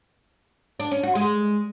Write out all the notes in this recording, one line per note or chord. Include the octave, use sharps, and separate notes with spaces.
D4
C#4
F#4
G#3